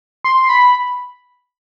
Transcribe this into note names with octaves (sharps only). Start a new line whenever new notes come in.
C6
B5